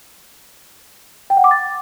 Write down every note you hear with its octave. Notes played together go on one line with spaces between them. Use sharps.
G5
F#5
D6
A6